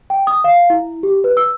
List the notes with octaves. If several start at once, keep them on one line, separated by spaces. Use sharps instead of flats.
G5
D#6
F5
E4
G4
B4
E6